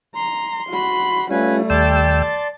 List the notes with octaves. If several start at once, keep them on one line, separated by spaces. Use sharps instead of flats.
A#5 C6
F#4 B5
G3 A3 C#4 F4 B4 G#5
D#2 D5 G5 A5 C6 E6